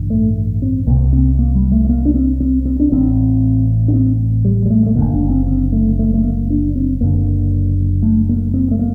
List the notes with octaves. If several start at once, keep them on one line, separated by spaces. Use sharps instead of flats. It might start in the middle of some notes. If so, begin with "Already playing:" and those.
Already playing: A1 G2 D3
A3
C4
C2 C3 A#3
C4
A#3
G3
A3
A3
A#3
D4
C4
C4
C4
D4
A1 A2 C4
D4
C4
G3
G3
A3
A3
F#2 D3 A#3
F#1
D4
C4
C4
A3
A3
A3
A#3
D4
C4
F#1 F#2 D3 A#3
A3
A#3
C4
A3
A#3